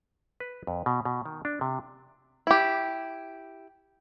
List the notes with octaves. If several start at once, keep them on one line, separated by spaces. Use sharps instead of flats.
B4
F2
B2
B2
D#3
D4
C3
E4 G4